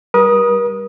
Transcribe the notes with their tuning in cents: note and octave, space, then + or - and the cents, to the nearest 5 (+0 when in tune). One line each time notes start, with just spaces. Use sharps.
G3 +0 A#4 +45 D#6 +0